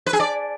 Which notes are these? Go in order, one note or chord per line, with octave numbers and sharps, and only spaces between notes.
B4
G#4
D5